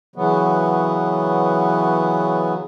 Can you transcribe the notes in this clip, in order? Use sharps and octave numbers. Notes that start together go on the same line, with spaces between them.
C#3 E3 F#3 B3